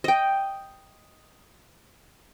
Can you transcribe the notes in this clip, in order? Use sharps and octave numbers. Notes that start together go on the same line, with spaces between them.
D#5 G5